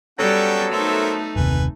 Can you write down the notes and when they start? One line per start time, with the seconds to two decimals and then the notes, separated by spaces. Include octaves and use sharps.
0.19 F#3 G3 B3 C#4 A4 F#5 G5
0.72 A3 D#4 A#4 C5 E5
1.36 F#1 D#2 C3 B4 G#5